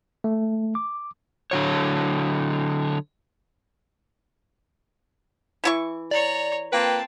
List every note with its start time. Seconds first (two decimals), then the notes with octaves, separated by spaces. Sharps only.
0.24 A3
0.75 D6
1.51 D3 F#3 C#5
5.64 E3 E4 C#6
6.11 C#5 D5 A#5
6.73 A#3 C4 F4 B4 G5 A5